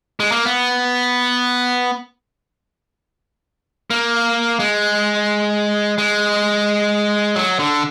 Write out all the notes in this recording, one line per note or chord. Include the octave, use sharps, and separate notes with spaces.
G#3
A#3
B3
A#3
G#3
G#3
F#3
D3